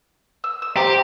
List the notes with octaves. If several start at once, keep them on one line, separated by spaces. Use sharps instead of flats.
E6
E6
G4 C5 A#5